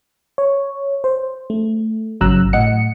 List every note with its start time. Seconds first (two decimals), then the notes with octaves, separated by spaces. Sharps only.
0.38 C#5
1.04 C5
1.50 A3
2.21 G#1 C#3 F#3 A#5 E6 F#6
2.53 A2 D#5 F#5 C#7